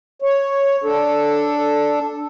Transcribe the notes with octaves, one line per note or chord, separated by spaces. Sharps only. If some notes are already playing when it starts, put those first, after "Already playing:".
C#5
D4 A4